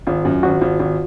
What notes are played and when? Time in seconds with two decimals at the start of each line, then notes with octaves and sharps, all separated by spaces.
0.07 G#1 F4
0.25 F#2 F#4
0.43 G#1 F#4
0.61 G#1 F4
0.79 G#1